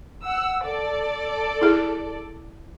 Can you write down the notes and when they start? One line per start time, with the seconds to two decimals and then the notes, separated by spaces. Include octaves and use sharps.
0.24 F#5 E6
0.64 A4 D5
1.62 E4 G#4